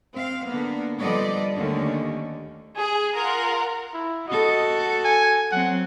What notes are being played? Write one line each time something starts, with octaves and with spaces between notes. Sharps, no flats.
C4 F5
D3 A#3 B3
F3 G3 B3 A4 D5 D#5
D#2 D3 D#3 A3 C#4
G#4
F4 A#4 F#5
E4
F#4 A4 D#5
G#5
F#3 C4 F#5